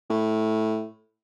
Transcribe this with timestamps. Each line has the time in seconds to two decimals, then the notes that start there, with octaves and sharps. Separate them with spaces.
0.10 A2